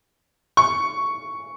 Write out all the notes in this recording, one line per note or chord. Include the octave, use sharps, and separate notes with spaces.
C#6